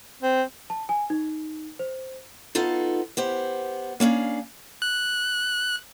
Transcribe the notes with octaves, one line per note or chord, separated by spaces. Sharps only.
C4
A5
G#5
D#4
C5
B3 D#4 F4 A4
B3 G4 C5
A#3 C#4 D4 F5
F#6